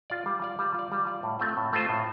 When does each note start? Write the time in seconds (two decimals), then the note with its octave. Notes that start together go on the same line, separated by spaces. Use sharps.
0.10 F4 D5
0.26 G3
0.42 F4 D5
0.59 G3
0.74 F4 D5
0.92 G3
1.07 F4 D5
1.23 A2
1.39 A3 C4 F4 C5
1.57 A2
1.73 A3 C4 F4 C5
1.89 A2